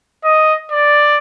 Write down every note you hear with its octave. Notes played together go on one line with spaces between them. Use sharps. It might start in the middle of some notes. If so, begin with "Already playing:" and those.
D#5
D5